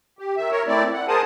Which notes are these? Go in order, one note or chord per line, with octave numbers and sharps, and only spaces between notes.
G4
D#3 E5
A#4 C#5
A3 C4 E4 D5
F#5
G#4 A#4 C5 A5 D#6